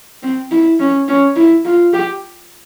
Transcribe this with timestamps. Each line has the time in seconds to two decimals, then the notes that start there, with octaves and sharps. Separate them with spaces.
0.23 C4
0.51 E4
0.80 C#4
1.08 C#4
1.36 E4
1.65 F4
1.93 G4